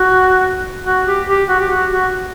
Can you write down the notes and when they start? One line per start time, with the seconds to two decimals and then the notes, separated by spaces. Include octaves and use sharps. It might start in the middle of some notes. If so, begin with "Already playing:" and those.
Already playing: F#4
0.85 F#4
1.06 G4
1.28 G4
1.49 F#4
1.59 G4
1.69 F#4
1.91 F#4